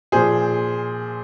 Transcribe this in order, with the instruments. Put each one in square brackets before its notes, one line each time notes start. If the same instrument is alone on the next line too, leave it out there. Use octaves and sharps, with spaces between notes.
[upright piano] A#2 F3 G#4 C5